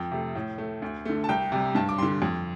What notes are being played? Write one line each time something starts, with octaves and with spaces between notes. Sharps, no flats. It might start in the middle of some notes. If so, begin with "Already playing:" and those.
Already playing: F2 G5
C3 A3
A2
A3
D2
D3 A3
A5
C2 G5
C3 G3
G2 A5
D6
D3 G3 C6
F2